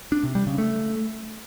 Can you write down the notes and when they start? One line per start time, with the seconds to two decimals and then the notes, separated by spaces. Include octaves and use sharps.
0.12 D4
0.24 C3
0.35 G3
0.47 C#3
0.58 A3